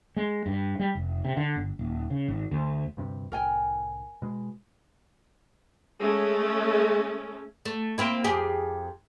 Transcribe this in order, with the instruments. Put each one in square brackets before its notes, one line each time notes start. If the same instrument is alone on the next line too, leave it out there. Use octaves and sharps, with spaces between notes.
[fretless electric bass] G#3
G2
G3
F1
C3
D3
G1
D#1
C#3
G#1
D2
[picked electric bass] D2 G2 C3
[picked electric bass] C2 A2 [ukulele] A#4 G5 G#5
[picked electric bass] B2 G#3
[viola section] G#3 A3 C#4
[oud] A3
A#3 C4 E4
F2 G4 G#4